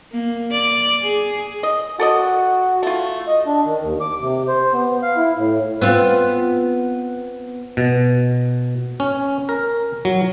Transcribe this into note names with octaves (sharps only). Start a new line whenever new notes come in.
A#3
D5
G#4
D#5
F#4 A4 D5 D#5
A3 F4
D#5
D4
D#3
D#2
D6
C3
C5
B3
F5
E4
A2
B3 C4 F4
B2
C#4
A#4
F#3